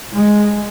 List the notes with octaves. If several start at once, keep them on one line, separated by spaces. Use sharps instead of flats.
G#3